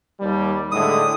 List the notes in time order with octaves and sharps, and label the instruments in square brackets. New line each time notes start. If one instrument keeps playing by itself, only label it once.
[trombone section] D#2 G3
[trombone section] A2 D3 G#3 [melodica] D#6